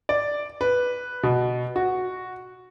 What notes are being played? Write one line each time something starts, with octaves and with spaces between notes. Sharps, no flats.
D5
B4
B2
F#4